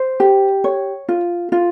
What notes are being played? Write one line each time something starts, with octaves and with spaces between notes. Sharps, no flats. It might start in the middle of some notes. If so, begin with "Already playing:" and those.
Already playing: C5
G4
C#5
F4
F4